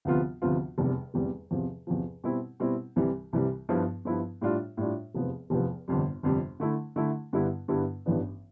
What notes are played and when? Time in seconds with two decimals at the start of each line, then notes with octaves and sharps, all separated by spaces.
0.05 D2 C3 F3 B3 F4
0.42 D2 C3 F3 B3 F4
0.78 F1 E2 C3 G3
1.14 F1 E2 C3 G3
1.51 E2 C3 F3
1.87 E2 C3 F3
2.24 B2 G3 C4 E4
2.60 B2 G3 C4 E4
2.96 C2 C3 E3 G3
3.33 C2 C3 E3 G3
3.69 G2 F3 B3 E4
4.05 G2 F3 B3 E4
4.41 A2 G3 D4 F4
4.77 A2 G3 D4 F4
5.14 F1 E2 C3 F3 B3
5.50 F1 E2 C3 F3 B3
5.88 G1 F2 C3 G3
6.23 G1 F2 C3 G3
6.60 D3 A3 E4
6.96 D3 A3 E4
7.33 G2 D3 G3 B3 E4
7.68 G2 D3 G3 B3 E4
8.06 A1 G2 E3 B3 D4